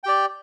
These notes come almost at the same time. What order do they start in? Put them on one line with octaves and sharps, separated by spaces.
G5 G4 D5